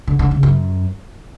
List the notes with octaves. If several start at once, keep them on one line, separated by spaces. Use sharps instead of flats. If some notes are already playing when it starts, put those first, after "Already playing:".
D3
D3
C#3
F#2